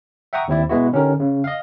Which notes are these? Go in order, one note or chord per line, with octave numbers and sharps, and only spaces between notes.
E5 F#5 G5 A#5 C#6 D#6
D#2 C4 E4 D5
B2 G#3 B3 E4 F#4
D3 C#4 D#4 G4 A#4
C#3
D#5 F5